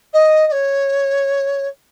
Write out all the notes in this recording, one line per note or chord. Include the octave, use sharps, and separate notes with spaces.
D#5
D#5
C#5